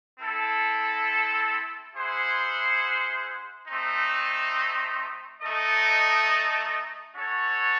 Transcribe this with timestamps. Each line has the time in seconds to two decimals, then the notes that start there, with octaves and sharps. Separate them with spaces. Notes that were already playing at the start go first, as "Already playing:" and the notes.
0.19 C4 E4 A4
1.94 E4 G#4 C5 F#5
3.67 A3 C4 D#4
5.41 A3 D#4 A4 D#5
7.16 C#4 F#4 A4 C#5